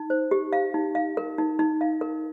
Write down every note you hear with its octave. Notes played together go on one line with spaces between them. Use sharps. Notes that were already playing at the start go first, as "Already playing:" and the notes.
Already playing: D#4
C5
G4
F5
D#4
F5
A#4
D#4
D#4
F5
A#4